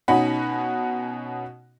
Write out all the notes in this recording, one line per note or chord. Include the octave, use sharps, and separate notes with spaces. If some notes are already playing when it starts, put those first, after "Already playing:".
B2 C#4 D#4 F#4 F#5 B5